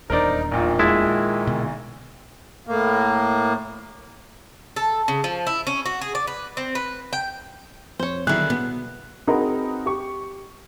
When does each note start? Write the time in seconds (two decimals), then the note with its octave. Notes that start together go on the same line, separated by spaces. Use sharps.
0.10 D#1 E2 D4 D#4 A#4 C5 D5
0.51 A#1 A#2 D#3
0.79 G#3 E4 A5
1.47 B2 D3
2.67 A2 A#3
4.76 A4
5.08 C#3
5.24 F3
5.47 E4
5.67 C#4
5.86 F#4
6.02 G#4
6.15 D5
6.27 B4
6.57 C4
6.75 B4
7.13 G5
7.99 F2 C5 C#5
8.27 B1 D3 D#3 E4 G#4 F#6 C7
8.50 B2 B3
9.27 C4 D#4 F#4 G#4 A#4 B4
9.86 G4 C#6